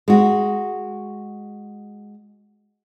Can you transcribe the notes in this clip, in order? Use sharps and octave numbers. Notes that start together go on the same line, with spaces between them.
G#3 F#4